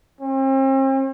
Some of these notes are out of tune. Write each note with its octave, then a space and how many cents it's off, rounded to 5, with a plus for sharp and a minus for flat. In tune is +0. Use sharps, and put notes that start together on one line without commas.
C4 +40